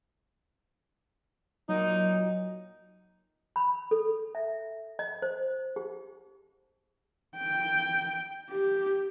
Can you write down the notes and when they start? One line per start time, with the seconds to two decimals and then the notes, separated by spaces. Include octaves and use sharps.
1.69 A#2 F#3 D#4
3.56 B5
3.91 A4
4.35 E5
4.99 D#5
5.22 C5
5.76 G4
7.37 G5
8.51 G4